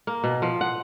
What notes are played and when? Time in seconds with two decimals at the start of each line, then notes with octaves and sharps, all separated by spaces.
0.07 A#3
0.24 B2
0.42 F3
0.61 F#5